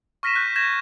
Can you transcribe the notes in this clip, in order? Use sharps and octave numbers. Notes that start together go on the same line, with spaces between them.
C#6 F6 A#6 B6 D#7 E7
F#6 G6
G6 G#6 A#6 E7